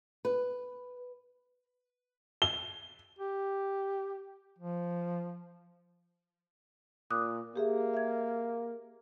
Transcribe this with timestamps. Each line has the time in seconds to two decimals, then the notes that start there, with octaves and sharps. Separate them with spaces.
0.25 B4
2.42 G7
3.19 G4
4.59 F3
7.10 A#2 D6 D#6 F#6
7.56 A#3 G4 G#4 E5
7.94 E5 G#6